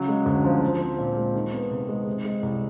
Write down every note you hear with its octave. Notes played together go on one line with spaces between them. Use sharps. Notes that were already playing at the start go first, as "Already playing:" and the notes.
Already playing: C#3 F#3
G#3
D2
F3
F3
C4
A#2
G#3
D#3
B3
C3
G#3
C3
G#3
C2